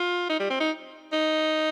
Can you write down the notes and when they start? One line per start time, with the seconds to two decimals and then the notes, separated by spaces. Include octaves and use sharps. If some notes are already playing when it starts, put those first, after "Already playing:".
Already playing: F4
0.29 D#4
0.39 G3
0.50 C4
0.60 D#4
1.12 D#4